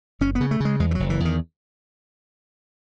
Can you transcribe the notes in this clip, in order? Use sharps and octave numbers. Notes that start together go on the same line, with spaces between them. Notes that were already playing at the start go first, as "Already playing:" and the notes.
F#1 C#4
B3
C#3
A3
C#3 G#3
E2 G#3
E3
F#1 F#3
E3
E2 D#3